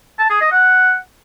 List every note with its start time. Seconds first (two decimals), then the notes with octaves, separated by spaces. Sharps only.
0.19 A5
0.30 G#4
0.41 D#5
0.52 F#5